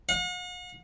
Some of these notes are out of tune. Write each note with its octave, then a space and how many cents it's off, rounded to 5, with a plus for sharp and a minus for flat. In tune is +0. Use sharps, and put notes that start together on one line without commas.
F#5 -45